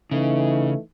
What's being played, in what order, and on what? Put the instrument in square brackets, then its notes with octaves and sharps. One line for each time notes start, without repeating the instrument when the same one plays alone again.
[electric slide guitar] C#3 [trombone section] E3 A3 D#4